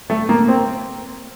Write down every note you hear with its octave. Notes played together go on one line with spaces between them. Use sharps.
A3
A#3
C4